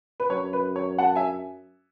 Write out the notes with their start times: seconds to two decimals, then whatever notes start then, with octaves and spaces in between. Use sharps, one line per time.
0.20 B4
0.30 F#2 C#5
0.53 B4
0.76 C#5
0.98 F#5 A5
1.15 E5 G#5